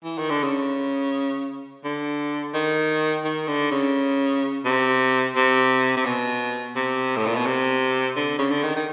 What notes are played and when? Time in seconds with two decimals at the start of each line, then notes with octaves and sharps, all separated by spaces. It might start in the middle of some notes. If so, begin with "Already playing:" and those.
0.04 E3
0.18 D#3
0.30 D3
0.43 C#3
1.84 D3
2.54 D#3
3.24 D#3
3.48 D3
3.71 C#3
4.65 C3
5.36 C3
5.97 C3
6.06 B2
6.76 C3
7.17 A2
7.27 A#2
7.36 B2
7.46 C3
8.16 D3
8.39 C#3
8.51 D3
8.63 D#3
8.76 D#3